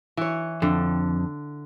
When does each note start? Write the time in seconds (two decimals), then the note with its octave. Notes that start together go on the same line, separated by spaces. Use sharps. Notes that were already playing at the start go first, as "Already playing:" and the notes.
0.17 E3 C#5
0.62 F2 D3